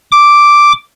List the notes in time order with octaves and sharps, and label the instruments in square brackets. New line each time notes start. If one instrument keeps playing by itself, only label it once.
[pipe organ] D6